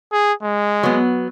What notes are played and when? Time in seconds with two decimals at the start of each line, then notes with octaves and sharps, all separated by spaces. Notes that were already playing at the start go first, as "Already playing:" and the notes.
0.12 G#4
0.43 G#3
0.83 F#3 B3